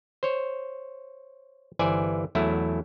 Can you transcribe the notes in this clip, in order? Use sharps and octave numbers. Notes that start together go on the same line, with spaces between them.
C5 C#5
G1 E3 C5 D5 G#5
E2 F#3 A3 E4